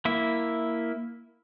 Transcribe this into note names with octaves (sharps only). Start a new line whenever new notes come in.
A#3 E4 E5